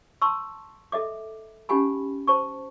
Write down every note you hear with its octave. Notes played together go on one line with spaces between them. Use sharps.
A5 C6 C#6 E6
A4 D#5 E5 D6
C#4 D#4 G4 F#5 G#5 B5
C5 A5 C#6